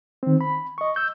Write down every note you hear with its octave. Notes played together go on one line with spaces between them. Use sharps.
D#3 C4
B5
D#5 C#6
E6 G6